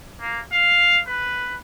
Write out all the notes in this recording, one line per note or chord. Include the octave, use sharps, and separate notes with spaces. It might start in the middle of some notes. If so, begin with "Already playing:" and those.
A#3
F5
B4